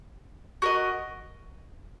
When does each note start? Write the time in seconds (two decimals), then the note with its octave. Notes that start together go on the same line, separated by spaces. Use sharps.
0.62 F#4 A#4 D#5